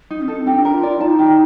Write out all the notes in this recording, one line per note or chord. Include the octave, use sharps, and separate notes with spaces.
D#4
D4
C4
A4
D4 D#4 G4
A#4
F4
D5
D#4 A5
G4